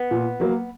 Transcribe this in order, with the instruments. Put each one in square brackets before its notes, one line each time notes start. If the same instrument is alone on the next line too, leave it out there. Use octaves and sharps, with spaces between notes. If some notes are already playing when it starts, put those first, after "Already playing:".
Already playing: [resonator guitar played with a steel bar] B3
[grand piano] A#2
F#3 A#3